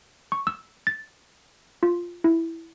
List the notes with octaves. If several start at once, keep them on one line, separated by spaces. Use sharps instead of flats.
C#6
E6
A6
F4
E4